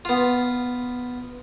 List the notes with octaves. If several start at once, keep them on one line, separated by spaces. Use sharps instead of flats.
B3 F4